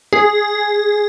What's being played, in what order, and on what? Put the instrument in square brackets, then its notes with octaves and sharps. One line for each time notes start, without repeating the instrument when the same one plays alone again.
[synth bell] G#4